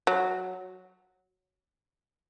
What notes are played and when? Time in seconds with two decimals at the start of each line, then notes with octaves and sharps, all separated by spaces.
0.07 F#3